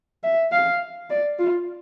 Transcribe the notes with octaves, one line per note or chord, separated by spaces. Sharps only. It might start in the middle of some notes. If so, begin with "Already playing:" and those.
E5
F5
D5
F4